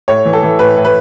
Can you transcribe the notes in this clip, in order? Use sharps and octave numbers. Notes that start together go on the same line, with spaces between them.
A2 C#5
E3
A4
E3
A2 B4
A2
B4